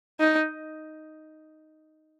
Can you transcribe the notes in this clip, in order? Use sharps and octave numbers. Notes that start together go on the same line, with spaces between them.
D#4